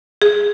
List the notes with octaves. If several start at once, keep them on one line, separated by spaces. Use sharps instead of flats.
G#4